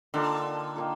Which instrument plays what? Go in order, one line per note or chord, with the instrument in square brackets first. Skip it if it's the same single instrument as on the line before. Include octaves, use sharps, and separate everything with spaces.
[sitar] D3 [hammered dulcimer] D#3 A#3 F4 A4
[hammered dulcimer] D#3 A#3 F4 A4